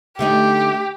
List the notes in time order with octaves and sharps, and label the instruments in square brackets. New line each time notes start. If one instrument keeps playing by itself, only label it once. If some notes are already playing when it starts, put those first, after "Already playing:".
[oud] D3 A3 D#4 [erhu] G4